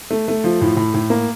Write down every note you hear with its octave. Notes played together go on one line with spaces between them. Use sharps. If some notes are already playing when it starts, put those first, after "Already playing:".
A3
A3
F3
A2
A2
A2
A#3